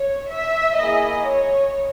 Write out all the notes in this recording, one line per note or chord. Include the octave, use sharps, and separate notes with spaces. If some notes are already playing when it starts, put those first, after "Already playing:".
Already playing: C#5
E5
A#3 E4 G#4 D#5
C#5